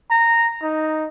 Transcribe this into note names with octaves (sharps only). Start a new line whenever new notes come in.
A#5
D#4